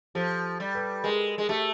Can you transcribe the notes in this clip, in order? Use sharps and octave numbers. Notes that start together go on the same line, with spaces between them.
F3 G4 A4
G3
A4 B4
G#3 G#4 A#4
G#3
A3 G4 A4